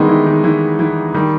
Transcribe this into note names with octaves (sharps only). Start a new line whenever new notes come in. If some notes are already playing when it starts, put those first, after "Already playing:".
Already playing: D#3 G3 G#3 B3 D#4
E3
D#3
E3
E3
D#3 G3